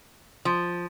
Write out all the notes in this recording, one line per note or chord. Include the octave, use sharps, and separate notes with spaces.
F3